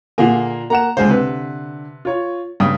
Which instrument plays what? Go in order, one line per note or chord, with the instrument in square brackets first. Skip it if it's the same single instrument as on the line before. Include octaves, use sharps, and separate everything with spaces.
[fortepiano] A#2 D3 A#3 [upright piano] G#4
[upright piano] A#3 F#5 E7 [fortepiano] A#5
[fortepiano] C#2 G#3 C5 [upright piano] D3
[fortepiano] C3 B4
[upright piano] F4 C#5
[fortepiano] G2 [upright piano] C#3 G5 D#6